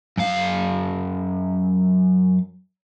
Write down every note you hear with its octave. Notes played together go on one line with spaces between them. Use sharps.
F#2 F5